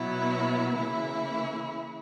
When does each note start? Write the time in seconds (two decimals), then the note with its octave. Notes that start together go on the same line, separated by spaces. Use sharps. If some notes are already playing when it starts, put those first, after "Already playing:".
Already playing: B2 F#3 B3 E4
0.76 C#3 E3 A#3 E4